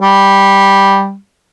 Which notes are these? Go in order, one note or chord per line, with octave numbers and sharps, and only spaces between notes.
G3